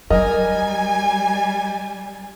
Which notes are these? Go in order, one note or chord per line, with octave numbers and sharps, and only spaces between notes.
F#3 G3 A#4 D#5 G#5